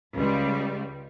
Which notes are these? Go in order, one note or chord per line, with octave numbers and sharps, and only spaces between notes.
C#2 G3